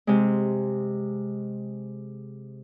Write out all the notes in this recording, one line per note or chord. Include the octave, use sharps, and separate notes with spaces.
C3 G#3